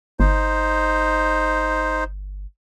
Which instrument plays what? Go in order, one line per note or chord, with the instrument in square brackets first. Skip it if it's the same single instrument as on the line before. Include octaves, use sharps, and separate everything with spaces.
[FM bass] G1 [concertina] D#4 C5